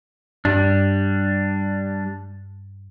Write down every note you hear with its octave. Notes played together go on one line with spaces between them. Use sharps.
G2 G3 D4